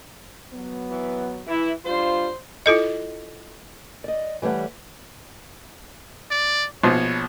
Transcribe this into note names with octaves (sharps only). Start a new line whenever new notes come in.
F#3 B3
E3
E3 E4
G3 D4 F4 C5
E4 F4 A4 D#5
D5 D#5
E3 G3 A3 C#5 F#5
D5
A#1 B2 C5 C#5